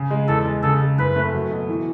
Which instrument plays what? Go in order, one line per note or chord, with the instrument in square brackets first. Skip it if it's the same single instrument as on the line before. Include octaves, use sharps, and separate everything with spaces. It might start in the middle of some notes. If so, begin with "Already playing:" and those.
Already playing: [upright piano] C#3
G#3
[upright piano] E2 [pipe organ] A4
[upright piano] G#3
[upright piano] C#3 [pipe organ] A4
[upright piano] G#3
[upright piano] F#1 [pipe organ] B4
[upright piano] A3
F#3
B2
E3